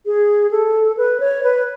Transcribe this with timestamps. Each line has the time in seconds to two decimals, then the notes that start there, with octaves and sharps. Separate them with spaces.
0.06 G#4
0.51 A4
0.97 B4
1.20 C#5
1.43 B4